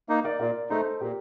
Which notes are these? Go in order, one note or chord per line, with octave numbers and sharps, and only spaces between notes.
A#3 D#4
A#4 D5
A#2 A#4 D5
A3 D#4 A4 C5
A#2 G4 A#4